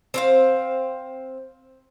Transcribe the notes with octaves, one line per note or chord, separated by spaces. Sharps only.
C4 C5 F5